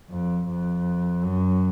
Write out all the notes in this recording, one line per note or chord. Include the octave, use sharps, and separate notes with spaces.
F2
F2
F#2